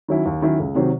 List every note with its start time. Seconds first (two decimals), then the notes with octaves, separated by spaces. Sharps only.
0.08 D#3 F#3 C#4 E4
0.26 D#2
0.42 D#3 F#3 C#4 E4
0.60 C#2
0.75 C3 D#3 F#3